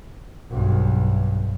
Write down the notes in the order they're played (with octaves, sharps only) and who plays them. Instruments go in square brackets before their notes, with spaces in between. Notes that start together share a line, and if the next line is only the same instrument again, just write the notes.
[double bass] B1 G2